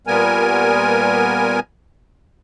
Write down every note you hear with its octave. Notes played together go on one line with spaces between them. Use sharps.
A#2 G3 B3 A#4 G#5